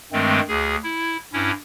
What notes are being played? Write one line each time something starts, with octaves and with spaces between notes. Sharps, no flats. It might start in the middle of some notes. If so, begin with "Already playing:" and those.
G2 D#3 G#3 A3 C4
D2 G#4
E4
G2 C#4 E4